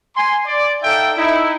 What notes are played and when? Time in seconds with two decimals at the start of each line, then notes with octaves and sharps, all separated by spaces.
0.16 G#5 C6
0.46 D5
0.83 D#4 A4 E5 F5 G5
1.17 D#4 E4